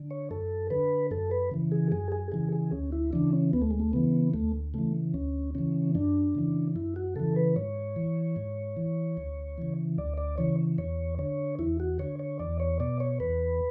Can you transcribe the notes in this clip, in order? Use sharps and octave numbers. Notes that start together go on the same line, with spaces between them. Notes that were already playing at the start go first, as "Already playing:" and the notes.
Already playing: D3
C#5
F#2 A4
D3 B4
F#2 A4
B4
C#3 E3
G#4
F#2 G#4
G#4
C#3 E3 G#4
G#4
D2 C#4
E4
C#3 E3 D4
C#4
D2 B3
A3
G#3
A3
C#3 E3 B3
D2 A3
C#3 E3 A3
D2 C#4
C#3 E3 C#4
F#2 D4
C#3 E3
F#2 E4
F#4
C#3 E3 A4
B4
G#2 C#5
E3
G#2
E3
D2
C#3 E3
D2 D5
D5
C#3 E3 C#5
E2 C#5
D3 C#5
E2 E4
F#4
D3 C#5
C#5
E2 D5
C#5
B2 D5
C#5
E2 B4